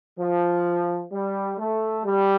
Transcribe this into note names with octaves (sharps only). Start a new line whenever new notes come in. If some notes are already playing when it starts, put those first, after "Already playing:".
F3
G3
A3
G3